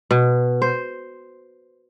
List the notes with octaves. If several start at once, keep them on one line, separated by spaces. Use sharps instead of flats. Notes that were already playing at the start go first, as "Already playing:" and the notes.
B2
C5